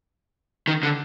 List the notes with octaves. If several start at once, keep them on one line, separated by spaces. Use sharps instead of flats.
D#3
D3